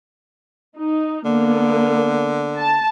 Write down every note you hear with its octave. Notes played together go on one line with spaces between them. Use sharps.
D#4
D3 A#3 B3
A5